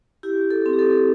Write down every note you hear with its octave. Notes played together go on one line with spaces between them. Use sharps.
E4 G4
A4
C4
G4
A4